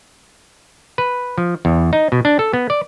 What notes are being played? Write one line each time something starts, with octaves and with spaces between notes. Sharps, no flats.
B4
F3
E2
D#4
B2
D4
A4
B3
D5